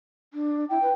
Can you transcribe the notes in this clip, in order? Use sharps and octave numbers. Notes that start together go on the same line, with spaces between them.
D4
E4 G5
B4